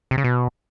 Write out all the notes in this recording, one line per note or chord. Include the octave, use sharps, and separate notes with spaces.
C3
C#3
B2